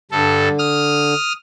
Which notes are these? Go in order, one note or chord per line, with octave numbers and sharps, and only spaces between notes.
G2 D3 A4
D#6 F6